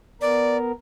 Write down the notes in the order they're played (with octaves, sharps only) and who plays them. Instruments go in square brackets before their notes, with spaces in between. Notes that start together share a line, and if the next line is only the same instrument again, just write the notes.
[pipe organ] B3 A#4 [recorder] D5